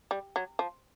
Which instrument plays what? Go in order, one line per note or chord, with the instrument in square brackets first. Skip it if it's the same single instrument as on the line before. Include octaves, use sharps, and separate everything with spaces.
[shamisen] G3
F#3
F3